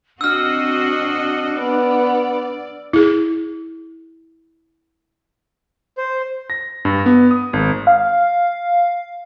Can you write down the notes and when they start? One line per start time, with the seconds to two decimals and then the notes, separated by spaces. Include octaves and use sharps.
0.21 C4 D4 F#4 D#5 E6 F6
1.59 B3 D5
2.93 E4 G#4
5.98 C5
6.50 A#6
6.85 G2
7.06 B3
7.31 D#6
7.53 G#1
7.87 F5